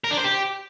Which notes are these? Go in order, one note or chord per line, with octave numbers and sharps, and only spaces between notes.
A#4
D4
C5
G4